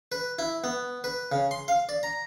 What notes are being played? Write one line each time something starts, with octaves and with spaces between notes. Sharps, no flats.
B4
E4
B3
B4
C#3
C6
F5
D5
A#5